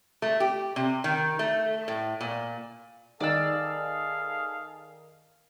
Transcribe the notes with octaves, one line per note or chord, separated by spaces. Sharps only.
A3
G4
C3
D#3
A3
A2
A#2
D#3 D#4 G#4 A4 D5 F5 E6